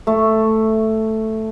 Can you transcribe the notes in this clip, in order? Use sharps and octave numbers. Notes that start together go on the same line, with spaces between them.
A3